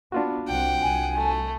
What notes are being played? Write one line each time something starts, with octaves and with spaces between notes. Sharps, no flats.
B3 D4 F4 F#4
C2 C4 F#5 G5
C2 G#5
A3